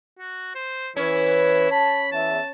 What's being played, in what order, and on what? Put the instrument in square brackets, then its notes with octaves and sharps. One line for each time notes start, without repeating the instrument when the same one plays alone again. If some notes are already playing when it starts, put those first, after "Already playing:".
[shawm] F#4
C5
[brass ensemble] E3 B4 [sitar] C#4 [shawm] E4
[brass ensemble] A5 [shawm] B5
[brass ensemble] E2 E5 [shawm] A5